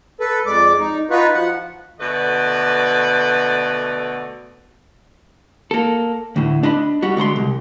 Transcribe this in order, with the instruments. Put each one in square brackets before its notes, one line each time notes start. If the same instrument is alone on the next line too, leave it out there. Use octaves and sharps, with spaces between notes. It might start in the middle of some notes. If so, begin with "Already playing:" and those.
[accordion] A4 B4
F2 G#3 D5 D6
D#4
D#4 F4 F#4 B4
F3 F#5
[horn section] B2 D3 A3 B4 D5
[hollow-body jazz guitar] A#3 A4
D2 A2
D4 D#5 B5
G3 F#4
D3 G#3 A#5 C6
C2